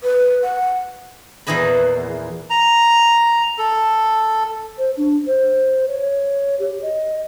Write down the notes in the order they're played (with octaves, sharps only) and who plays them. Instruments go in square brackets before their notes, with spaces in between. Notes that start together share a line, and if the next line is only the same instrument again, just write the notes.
[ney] B4
F#5
[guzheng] E2 A#2 E3 D#5 B5
[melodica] A#5
A4
[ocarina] C5
D4
C5
C#5
G4
D#5